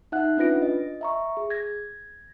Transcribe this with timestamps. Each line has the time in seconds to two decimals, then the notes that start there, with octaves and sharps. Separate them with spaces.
0.12 D#4 E5 F#5 F#6
0.37 C#4 D4 F4 B4 A#6 D7
0.62 D#5
1.01 E5 A#5 C#6
1.37 G#4
1.50 G#6 A#6